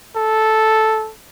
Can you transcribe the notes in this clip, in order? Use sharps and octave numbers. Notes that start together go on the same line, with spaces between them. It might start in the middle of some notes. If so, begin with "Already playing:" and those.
A4